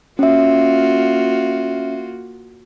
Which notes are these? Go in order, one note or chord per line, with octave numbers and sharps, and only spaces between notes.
A#3 C#4 F4 F#4 E5